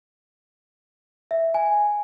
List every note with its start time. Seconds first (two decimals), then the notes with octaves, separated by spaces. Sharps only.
1.31 E5
1.54 G#5